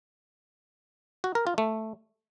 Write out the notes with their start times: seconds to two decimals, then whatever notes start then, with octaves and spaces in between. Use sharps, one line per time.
1.24 F#4
1.35 A#4
1.47 F4
1.58 A3